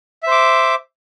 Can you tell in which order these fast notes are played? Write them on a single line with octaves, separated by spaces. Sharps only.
E5 C5 D6